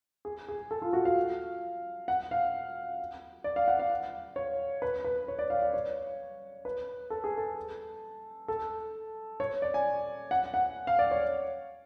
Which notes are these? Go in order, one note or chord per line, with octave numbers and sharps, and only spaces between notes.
G#4
G#4
A4
F4
F#4
F5
F#5
F5
D5
F5
F#5
F5
C#5
B4
B4
C#5
D5
F5
D5
C#5
B4
A4
G#4
A4
A4
C#5
D5
G#5
F#5
F#5
F5
D5
C#5